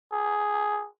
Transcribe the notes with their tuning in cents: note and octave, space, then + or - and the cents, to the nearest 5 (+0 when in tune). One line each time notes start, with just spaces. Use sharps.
G#4 +5